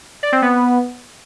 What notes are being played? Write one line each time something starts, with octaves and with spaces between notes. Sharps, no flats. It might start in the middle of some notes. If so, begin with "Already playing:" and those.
D5
C4
B3